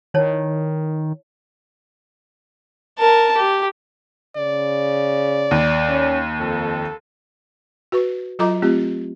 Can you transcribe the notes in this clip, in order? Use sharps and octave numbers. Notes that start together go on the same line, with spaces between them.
D#3 E4 C#5 A5
A#4 A5
G4
C#3 D5
D#2
C#4
F2 A4
F#4 B4 C#6
F#3 F4 A4 D#5 A#5 D6
A3 C4 F4 G4